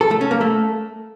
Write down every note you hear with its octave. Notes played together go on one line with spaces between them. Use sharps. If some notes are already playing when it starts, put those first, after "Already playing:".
A4
A3
C#4
A#3
A3